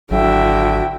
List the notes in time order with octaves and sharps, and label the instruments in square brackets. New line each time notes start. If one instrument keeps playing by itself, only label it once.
[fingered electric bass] G#1 F#3 [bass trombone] D3 [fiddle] E4 G5 [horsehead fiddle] F#4 E5